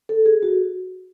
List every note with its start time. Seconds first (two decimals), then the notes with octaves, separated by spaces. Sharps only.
0.09 A4
0.26 G#4
0.43 F#4